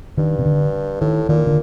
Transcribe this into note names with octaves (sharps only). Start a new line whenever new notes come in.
G2 D#3
C3
D3
A2 D#3
A#2 D#3
D3